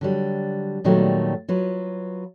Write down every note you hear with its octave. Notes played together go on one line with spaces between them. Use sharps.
D3 F#3 G3
A#2 D#3 F#3 G3 A3 B3
F#3 F4 B4